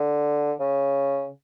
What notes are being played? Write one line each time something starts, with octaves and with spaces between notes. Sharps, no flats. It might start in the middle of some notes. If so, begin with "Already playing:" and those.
Already playing: D3
C#3